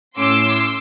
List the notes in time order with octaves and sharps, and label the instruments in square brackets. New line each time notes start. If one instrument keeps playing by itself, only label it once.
[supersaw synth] A2 C#4 [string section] C6 D6 E6